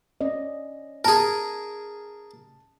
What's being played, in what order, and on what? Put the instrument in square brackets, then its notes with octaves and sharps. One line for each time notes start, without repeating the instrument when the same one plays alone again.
[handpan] C#4 D5 D#5
[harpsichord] G#4 A#4 [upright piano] A5